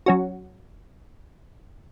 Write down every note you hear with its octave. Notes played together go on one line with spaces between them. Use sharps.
F#3 C#4 F#4